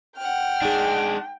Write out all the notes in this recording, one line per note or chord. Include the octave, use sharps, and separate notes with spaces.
F#5 G5 F6
G#3 D4 D#4 G#4